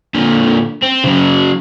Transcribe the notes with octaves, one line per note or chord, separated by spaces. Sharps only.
A#2 D3
C4
C#3 F#3